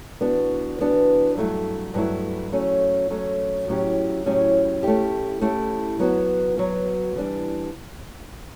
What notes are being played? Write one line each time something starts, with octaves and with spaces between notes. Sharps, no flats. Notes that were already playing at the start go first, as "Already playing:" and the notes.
E3 B3 D4 F#4
E3 B3 D4 F#4
G2 F#3 A3 E4
G2 F#3 A3 E4
F#3 A3 C#4 F#4
F#3 A3 C#4 F#4
A2 F#3 C#4 E4 G4
A2 F#3 C#4 E4 G4
A3 C#4 E4 G4
A3 C#4 E4 G4
F#3 B3 F#4
F#3 B3 F#4
E3 G3 D4